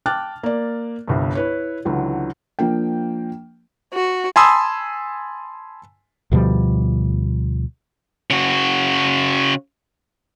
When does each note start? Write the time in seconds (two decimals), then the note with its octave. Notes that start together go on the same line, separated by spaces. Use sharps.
0.06 G5 A5 D6 F6 F#6 A6
0.43 A#3 D5
1.08 G1 C2 G2
1.35 E4 B4 C#5
1.85 C#2 D3 E3 F#3
2.59 F3 A#3 D4 G5
3.93 F#4
4.36 G#5 A5 B5 C6 D#6 E6
6.32 D2 B2 F3 G3
8.30 C#3 F#4